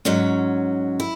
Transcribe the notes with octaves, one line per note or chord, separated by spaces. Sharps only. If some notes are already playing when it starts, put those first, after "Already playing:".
G#2 F#3 C#4
E4